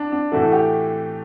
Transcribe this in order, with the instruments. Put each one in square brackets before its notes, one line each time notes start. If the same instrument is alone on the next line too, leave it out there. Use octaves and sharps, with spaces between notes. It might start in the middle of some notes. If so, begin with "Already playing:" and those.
Already playing: [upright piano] D4
D4
A2 E3 A3 F#4
A4
G4